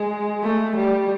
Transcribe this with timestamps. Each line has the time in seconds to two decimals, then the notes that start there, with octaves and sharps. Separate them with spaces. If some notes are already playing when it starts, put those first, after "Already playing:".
Already playing: G#3
0.43 A3
0.75 G3